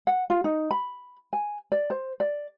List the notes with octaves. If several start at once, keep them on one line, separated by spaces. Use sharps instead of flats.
F#5
F4
D#4
B5
G#5
D5
C5
D5